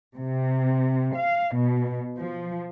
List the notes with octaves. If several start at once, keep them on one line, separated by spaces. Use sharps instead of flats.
C3
F5
B2
F3